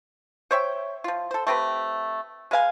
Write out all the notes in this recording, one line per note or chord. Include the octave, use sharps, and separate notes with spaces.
C5 C#5 E5 G5
F3 F4
A4 C5
A3 C4 G4 B4
G#3 B4 F5 G#5